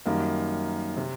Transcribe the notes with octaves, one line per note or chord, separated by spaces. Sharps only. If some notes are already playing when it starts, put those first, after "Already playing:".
F#2 D#3 G3 A#3
C3